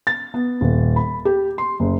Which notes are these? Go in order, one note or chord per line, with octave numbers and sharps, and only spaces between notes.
A6
B3
D#1
B5
G4
C6
F#1